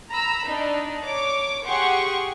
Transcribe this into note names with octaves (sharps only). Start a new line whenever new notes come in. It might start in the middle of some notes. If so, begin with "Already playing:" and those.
A#5 B5 E6
D4 D#4
C#5 D6
G4 G#4 F#5 C6 C#6